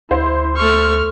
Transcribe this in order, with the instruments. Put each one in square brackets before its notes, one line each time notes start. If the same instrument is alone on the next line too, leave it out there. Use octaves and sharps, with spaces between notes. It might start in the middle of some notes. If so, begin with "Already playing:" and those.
[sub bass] D2 [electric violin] E4 [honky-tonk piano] C5
[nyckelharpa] A3 C#6 [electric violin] F6